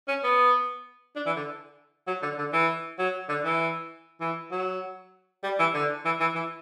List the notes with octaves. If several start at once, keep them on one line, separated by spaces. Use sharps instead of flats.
C#4
B3
D4
E3
D3
F#3
D3
D3
E3
F#3
D3
E3
E3
F#3
G3
E3
D3
E3
E3
E3